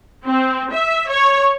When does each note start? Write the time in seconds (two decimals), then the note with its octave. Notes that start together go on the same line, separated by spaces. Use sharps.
0.25 C4
0.72 E5
1.09 C#5